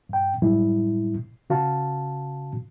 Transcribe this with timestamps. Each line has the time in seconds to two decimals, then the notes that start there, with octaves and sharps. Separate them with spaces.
0.09 G2 G5
0.42 F#2 A2 G3 E4
1.50 C#3 F#4 F5 A5